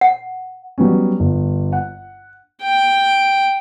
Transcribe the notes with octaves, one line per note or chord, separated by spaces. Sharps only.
F#5
F#3 G3 B3 C#4
G1
F#5
G5